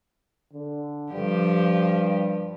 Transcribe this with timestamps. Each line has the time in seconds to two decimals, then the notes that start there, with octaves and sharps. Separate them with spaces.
0.53 D3
1.13 G2 F3 G4